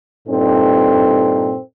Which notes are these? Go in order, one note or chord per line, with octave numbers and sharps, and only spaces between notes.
G2 A#2 C4 D#4 A4